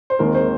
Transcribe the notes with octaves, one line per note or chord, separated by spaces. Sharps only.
C5
D#2 D#3 G#3 C4 A#4
C5